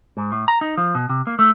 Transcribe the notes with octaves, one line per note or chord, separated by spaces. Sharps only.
G#2
A2
A#5
D#4
F3
B2
C3
A#3
A3